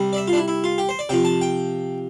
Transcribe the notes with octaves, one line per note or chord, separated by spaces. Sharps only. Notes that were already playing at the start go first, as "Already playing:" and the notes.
Already playing: C3 G3
D5
E5
F4
D4
E4
E4
F4
G4
C5
D5
C3 F3 G5
A5
G5